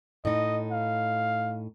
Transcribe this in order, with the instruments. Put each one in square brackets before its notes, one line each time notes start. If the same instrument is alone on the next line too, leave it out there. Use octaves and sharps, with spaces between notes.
[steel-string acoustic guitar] A2 D#4 [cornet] D#5
[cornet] F5